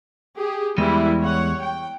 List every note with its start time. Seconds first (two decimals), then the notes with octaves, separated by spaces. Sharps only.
0.37 G4 G#4
0.78 E2 E3 G3 G#3 E4
1.21 C#5 F#5
1.62 G5